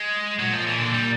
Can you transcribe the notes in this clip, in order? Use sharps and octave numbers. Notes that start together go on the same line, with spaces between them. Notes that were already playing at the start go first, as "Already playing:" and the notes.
Already playing: G#3
A#2 F#3
F3
E3
D3
G3